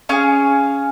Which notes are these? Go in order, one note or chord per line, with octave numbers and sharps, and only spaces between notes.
C#4 G#4 F5